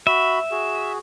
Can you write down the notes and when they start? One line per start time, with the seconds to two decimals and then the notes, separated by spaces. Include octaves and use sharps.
0.07 F#4 E5 B5
0.51 F#4 G#4